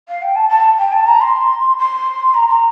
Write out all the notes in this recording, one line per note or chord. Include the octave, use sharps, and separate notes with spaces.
F5
G5
A5
A5
G5
A5
A#5
C6
C6
A#5
A#5